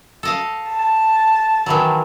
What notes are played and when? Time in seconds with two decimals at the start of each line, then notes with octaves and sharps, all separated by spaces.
0.23 A4 D#5 F5
0.69 A5
1.66 D#3 E3 F#3